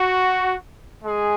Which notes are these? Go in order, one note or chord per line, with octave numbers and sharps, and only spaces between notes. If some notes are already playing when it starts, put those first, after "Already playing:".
Already playing: F#4
G#3 G#4